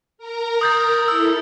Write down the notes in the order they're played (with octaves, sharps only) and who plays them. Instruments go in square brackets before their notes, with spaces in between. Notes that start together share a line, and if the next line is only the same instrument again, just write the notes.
[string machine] A#4 A#5
[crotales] D#6 G6 A6
[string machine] E4 A4 [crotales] E6